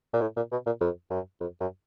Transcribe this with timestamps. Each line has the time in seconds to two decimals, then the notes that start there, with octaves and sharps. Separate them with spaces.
0.13 A#2
0.21 A2
0.36 A#2
0.52 B2
0.66 A#2
0.81 F2
1.10 F#2
1.41 F2
1.60 F#2